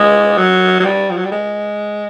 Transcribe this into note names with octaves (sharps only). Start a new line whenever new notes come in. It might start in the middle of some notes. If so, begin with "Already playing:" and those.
Already playing: G#3
F#3
F#3
G3
F3
F#3
G3
G#3